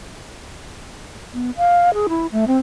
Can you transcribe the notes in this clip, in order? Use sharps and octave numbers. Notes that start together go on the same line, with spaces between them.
B3
F5
G#4
E4
A3
C4